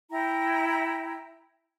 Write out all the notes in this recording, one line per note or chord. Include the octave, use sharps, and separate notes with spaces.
E4 G5 A#5